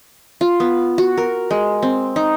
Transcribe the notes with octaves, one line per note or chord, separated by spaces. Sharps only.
F4
B3
F#4
A#4
G#3
C4
D#4